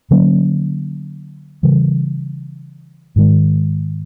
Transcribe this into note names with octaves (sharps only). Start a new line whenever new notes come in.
D3 F#3 A#3 C#4
C#3 E3 G3
G#2 D#3 G#3